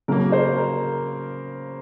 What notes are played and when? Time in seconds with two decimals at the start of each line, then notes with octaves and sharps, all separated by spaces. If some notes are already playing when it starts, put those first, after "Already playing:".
0.08 C#3 F#3 A#3 A#4
0.32 C5
0.56 A#4